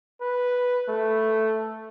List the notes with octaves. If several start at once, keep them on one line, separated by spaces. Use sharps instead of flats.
B4
A3